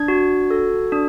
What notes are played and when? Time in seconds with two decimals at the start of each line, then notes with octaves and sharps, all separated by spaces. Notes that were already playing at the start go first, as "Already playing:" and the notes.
Already playing: D4 G#6
0.08 F#4
0.51 A4
0.92 D4